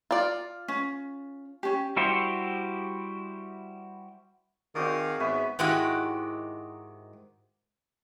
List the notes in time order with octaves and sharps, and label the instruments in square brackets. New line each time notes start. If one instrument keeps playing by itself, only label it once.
[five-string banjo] F4 D5
[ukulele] C#4
C#4 G4
[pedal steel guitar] G3 E4 F#4 G4 C5
[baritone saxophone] D#3 [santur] C4 F#4 D5 [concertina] G#4 F5 D#6
[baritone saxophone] G#2 [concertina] B3 [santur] B4 C#5 [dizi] E5
[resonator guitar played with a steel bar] G#2 D#3 G#3 E4 F#4 G4